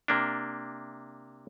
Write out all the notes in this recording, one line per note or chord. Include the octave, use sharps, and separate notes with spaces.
C3 A#3 D4